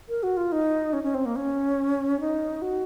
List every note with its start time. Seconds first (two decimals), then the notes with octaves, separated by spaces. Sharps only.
0.09 A#4
0.23 F#4
0.37 F4
0.52 D#4
0.93 C#4
1.04 C#4
1.14 C4
1.26 A#3
1.36 C#4
2.20 D#4
2.62 F#4